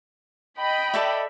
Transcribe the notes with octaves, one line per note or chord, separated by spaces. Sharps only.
D#5 G5 B5
A4 D5 E5